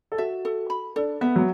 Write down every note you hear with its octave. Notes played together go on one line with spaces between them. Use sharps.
A4
F#4 E5
A4
B5
D4 A4
B3 E5
F#3